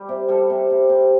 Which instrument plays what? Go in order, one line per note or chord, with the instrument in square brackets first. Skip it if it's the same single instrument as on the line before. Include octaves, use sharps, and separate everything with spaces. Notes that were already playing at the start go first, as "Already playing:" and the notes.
Already playing: [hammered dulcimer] G3 G4
C3
G3 A4
C3
C3
C3